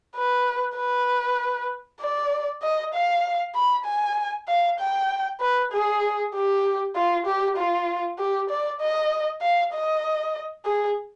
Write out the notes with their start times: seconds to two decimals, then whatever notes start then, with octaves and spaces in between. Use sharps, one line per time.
0.16 B4
0.77 B4
2.01 D5
2.63 D#5
2.94 F5
3.55 B5
3.86 G#5
4.48 F5
4.79 G5
5.40 B4
5.72 G#4
6.34 G4
6.95 F4
7.26 G4
7.56 F4
8.18 G4
8.50 D5
8.80 D#5
9.42 F5
9.73 D#5
10.65 G#4